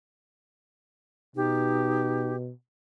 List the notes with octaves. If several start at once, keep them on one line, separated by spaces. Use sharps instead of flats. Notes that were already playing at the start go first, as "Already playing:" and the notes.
B2 D#4 G4